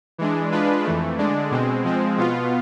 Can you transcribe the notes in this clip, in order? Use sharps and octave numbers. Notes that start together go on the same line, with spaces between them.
E3 G#3 D4
G#3 D4 F4 B4
F2 E3 A3
D3 G#3 D4
B2 G#3 C4
F3 G#3 C4
B2 B3 F4